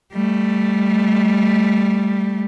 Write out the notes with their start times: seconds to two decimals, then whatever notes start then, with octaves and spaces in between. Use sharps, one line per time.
0.13 G3 A3